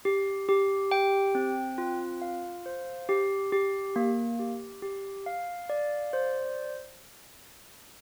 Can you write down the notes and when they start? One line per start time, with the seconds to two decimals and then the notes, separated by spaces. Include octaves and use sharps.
0.05 G4
0.49 G4
0.91 G5
1.35 C4
1.78 F4
2.22 F5
2.66 C5
3.09 G4
3.52 G4
3.96 A#3
4.39 G4
4.82 G4
5.26 F5
5.70 D5
6.13 C5